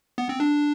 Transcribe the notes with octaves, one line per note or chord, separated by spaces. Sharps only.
B3
C4
D4